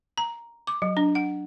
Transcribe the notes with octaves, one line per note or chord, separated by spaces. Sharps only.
A#5
D6
F#3
D4
F#5